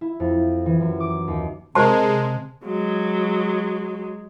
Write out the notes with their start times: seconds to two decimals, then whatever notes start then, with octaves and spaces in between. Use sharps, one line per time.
0.01 E4
0.20 F2
0.66 E3
0.80 F#2
1.00 D6
1.28 D#2
1.75 C3 G#3 A#4 C5 A5 C6
2.65 F#3 G#3